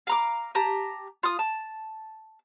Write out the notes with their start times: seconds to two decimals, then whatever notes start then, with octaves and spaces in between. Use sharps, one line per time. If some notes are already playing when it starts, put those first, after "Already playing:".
0.07 F5 A#5 D6
0.55 G4 A5 A#5
1.23 F4 D#6
1.39 A5